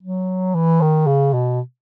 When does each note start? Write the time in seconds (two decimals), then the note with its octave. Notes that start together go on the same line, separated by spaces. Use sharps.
0.03 F#3
0.55 E3
0.81 D#3
1.07 C#3
1.33 B2